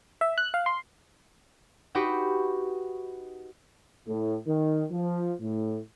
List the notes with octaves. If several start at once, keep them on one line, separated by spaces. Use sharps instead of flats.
E5
F#6
F5
C6
D#4 F#4 G4 B4 C#6 D6
A2
D#3
F3
A2